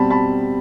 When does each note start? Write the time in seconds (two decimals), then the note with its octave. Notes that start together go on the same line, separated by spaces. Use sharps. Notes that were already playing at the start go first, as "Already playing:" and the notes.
Already playing: B2 G3 C4 A5 B5
0.10 A5 B5